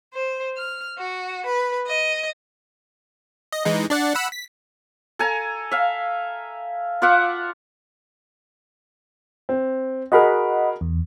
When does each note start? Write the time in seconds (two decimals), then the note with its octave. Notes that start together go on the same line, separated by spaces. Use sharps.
0.13 C5
0.55 F6
0.98 F#4
1.45 B4
1.86 D#5
3.52 D#5
3.65 E3 G#3 D#4
3.90 D4 D5 F#5
4.15 F#5 B5 E6
4.32 B6
5.19 A4 G#5 A#5
5.71 E5 F5
7.02 F4 D5 E5 F#5
9.49 C4
10.12 F#4 G#4 A#4 D#5 F#5 B5
10.81 E2